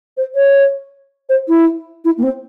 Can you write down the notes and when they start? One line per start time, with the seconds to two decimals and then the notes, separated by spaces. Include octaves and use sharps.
0.17 C5
0.35 C#5
1.29 C5
1.48 E4
2.05 E4
2.18 A#3
2.23 C4